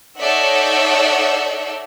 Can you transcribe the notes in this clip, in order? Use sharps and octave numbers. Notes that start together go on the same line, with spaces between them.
D#4 A4 C#5 D5 E5 F#5